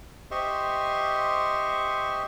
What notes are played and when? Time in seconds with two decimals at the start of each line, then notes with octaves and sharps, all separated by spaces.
0.31 G4 C5 D#5 E5 C6 C#6